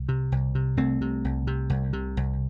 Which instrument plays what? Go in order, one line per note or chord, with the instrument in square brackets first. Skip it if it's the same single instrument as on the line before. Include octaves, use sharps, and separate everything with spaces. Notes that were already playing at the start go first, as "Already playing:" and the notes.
Already playing: [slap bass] C2
C3
C2
C3
C2 A3 C4
C3
C2
C3
C2
C3
C2